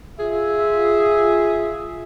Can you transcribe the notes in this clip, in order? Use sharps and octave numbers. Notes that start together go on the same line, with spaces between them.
F4 G#4 E5